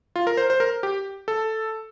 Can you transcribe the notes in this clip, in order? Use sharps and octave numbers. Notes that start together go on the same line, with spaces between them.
F4
A#4
C5
C5
A#4
G4
A4